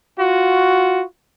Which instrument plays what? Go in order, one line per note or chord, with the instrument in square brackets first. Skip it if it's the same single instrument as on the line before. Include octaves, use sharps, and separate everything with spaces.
[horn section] F4 F#4